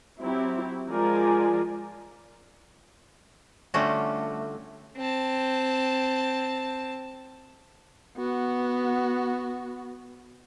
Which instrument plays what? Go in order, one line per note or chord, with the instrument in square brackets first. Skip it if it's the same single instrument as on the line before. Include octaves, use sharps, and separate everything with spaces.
[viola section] F#3 C4 E4 G4
F3 G#3 F4 A#4 D5 G#5
[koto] D3 G3 A3 C#4 F4 F#4
[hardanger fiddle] C4 A5
[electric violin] B3 F#4